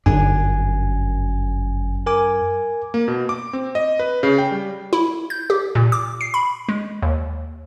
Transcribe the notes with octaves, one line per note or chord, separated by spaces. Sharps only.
G1 F#2 D4 G#5
A#4 G#5 D6
A#3
B2
D6
C4
D#5
B4
C#3
G5
G3
E4
G6
G4
A#2
D6
C7
B5
G#3
D#2